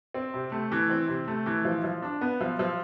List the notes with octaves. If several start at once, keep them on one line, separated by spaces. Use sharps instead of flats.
C4
C3
A3
E3
C4
C3
A3
E3
F3
F3
D4
B3
F3
F3